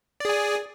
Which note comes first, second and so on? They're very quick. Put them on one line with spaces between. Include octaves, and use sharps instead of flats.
D5 G#4 G#5